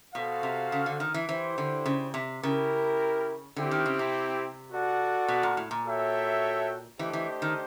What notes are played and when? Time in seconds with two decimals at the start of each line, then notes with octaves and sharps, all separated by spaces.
0.14 B2 F#4 A4 C5 F5
0.43 C3
0.72 C#3
0.86 D3
1.00 D#3
1.14 E3
1.29 E3 E4 G4 C5
1.58 D3
1.86 C#3
2.14 C3
2.43 C#3 E4 G4 A#4
3.56 D3 C4 E4 G4
3.71 D#3
3.86 C#3
3.99 C3
4.72 F#4 A4 D5 F#5
5.28 B2
5.43 A#2
5.57 A2
5.71 A#2
5.85 F#4 A4 C#5 E5 G5
6.99 E3 A3 D4 G4 C5 D#5
7.13 E3
7.42 D#3